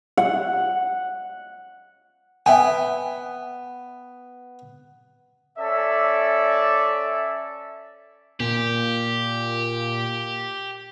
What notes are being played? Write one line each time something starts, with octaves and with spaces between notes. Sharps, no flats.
F#5
B3 E5 G5 G#5
C#4 A4 D5 E5
A#2 G4